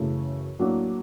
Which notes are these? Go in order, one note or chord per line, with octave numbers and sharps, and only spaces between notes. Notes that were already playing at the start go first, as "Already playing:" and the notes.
Already playing: F#2 C#3 E3 A3
A2 F#3 A#3 D4